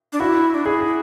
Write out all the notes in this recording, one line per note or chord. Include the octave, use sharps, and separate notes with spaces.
D4
E4 F#4
D4
E4 G#4
G#4